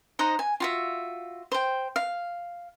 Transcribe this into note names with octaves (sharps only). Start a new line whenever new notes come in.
D#4 C5 D#5 F#5
G#5
F4 F#4 E5
C5 G5
F5